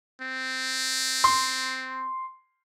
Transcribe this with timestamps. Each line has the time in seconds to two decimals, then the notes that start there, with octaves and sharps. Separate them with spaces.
0.21 C4
1.24 C6